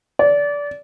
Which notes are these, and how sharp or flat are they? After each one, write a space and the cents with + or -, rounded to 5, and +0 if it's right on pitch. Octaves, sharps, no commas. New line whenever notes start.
D5 -20